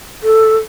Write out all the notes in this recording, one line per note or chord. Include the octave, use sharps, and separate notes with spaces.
A4